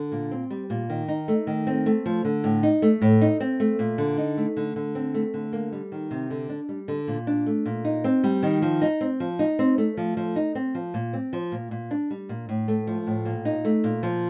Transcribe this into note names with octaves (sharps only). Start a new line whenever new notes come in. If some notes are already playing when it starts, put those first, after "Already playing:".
Already playing: D3
A#2
C4
G3
A#2
D#3
D#4
A3
D#3
C4
A3
F3
D3
A2
D#4
A3
A2
D#4
C4
A3
A#2
D3
D#4
A3
D3
D3
C4
A3
D3
A#3
G3
D#3
C3
D3
D4
G3
D3
A#2
D4
A3
A#2
D#4
C4
G3
D#3
F3
D#4
C4
F3
D#4
C4
A3
F3
F3
D#4
C4
F3
A#2
C4
F3
A#2
A#2
D4
G3
A#2
A2
A3
F3
A2
A#2
D#4
A3
A#2
F3